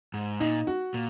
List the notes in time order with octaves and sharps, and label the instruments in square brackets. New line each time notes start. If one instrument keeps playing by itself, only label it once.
[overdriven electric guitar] G#2
[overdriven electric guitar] A#2 [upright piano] D#4
[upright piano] F#4
[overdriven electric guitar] A#2